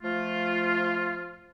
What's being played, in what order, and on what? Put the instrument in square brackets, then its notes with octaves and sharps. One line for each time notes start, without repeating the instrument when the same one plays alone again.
[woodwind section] F3 A3 F4